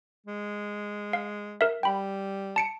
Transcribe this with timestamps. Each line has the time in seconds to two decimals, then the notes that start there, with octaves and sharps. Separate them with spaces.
0.27 G#3
1.13 F5
1.61 A#4 E5
1.83 G3 G5 B5
2.56 A5 C#7 D7